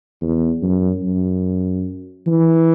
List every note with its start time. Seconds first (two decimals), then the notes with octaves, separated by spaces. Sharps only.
0.21 E2
0.62 F#2
1.03 F#2
2.27 E3